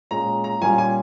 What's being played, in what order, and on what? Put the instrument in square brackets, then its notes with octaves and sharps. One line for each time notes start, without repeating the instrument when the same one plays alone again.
[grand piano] A#2 G#3 C#4 [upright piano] A#5
[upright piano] A#5
[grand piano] A#2 G3 A#3 C#4 F4 [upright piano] G#5
[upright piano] G#5